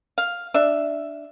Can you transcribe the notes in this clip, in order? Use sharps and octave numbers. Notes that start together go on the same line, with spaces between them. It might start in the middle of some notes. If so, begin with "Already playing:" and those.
F5
D4 E5